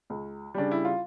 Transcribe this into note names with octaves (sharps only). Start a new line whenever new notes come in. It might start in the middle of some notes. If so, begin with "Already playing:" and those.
C#2
C#3 G3 D4
E4
F4